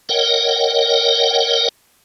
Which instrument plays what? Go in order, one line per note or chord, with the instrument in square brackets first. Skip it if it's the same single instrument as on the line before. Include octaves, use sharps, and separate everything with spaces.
[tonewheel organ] A#4 C#5 D#5 F#5 G5